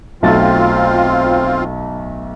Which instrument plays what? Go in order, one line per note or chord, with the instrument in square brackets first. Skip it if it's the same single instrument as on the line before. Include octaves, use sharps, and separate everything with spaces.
[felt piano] B1 A3 A6 [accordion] C4 F4